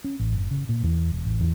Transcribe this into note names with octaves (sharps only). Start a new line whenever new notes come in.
C#4
A1
F#1
C#3
A#2
E2
E1
A1
E2